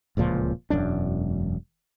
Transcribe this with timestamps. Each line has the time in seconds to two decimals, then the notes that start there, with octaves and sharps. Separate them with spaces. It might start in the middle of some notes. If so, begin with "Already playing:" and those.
0.17 D1 C#2 A#2 F3
0.70 E1 F#2 D4